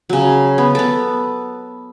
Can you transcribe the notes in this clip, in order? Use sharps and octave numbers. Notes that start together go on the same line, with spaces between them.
C#3 F#3
B3
B3 A4